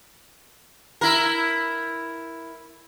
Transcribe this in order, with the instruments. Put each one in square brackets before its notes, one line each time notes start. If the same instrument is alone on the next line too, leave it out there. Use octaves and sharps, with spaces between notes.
[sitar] E4 A#4